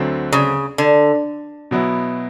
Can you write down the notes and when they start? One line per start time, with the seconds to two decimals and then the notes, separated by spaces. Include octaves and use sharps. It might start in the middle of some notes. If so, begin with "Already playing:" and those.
Already playing: D2 D3 F#3 A3 C4
0.32 C#3
0.78 D3
1.71 B2 F#3 B3 E4